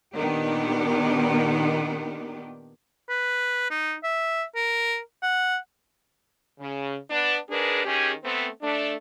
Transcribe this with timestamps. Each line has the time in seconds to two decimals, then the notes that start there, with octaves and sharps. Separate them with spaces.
0.13 A#2 D#3 B3 D4 G4
3.09 B4
3.71 D#4
4.04 E5
4.56 A#4
5.23 F#5
6.59 C#3
7.10 B3 D4
7.50 G#2 D4 G#4 A#4 B4
7.85 D#3 C#4 G4 G#4
8.23 A3 B3 C4
8.62 A3 D4